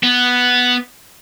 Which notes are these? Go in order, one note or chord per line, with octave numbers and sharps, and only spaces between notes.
B3